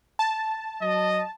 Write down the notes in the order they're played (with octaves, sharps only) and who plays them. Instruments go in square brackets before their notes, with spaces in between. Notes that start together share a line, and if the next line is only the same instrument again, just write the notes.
[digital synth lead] A5
[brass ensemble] F#3 D#5